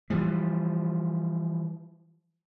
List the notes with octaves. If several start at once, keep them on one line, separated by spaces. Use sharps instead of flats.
E3 F3 G3